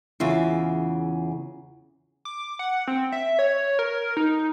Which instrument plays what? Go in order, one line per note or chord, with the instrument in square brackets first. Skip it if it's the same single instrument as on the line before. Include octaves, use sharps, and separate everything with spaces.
[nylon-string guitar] E2 C#3 F4 E5
[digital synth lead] D6
F#5
C4
E5
C#5
A#4
D#4